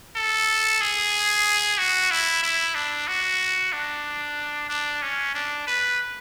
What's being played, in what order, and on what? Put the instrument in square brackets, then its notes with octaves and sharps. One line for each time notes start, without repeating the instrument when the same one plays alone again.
[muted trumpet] A4
G#4
F#4
E4
E4
D4
F#4
D4
D4
C#4
D4
B4